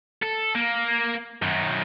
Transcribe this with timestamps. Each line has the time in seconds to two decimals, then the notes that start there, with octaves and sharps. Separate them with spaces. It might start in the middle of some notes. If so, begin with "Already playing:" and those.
0.23 A4
0.55 A#3
1.42 F#2 D#3